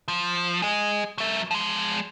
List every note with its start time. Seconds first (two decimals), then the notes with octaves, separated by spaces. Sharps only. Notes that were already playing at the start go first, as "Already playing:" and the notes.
0.08 F3
0.62 G#4 D#5
1.18 F#3 E5
1.51 F3 G#3